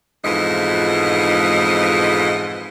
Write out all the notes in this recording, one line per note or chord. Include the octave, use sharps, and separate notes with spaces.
F2 G#2 B2 E3 F4 D#5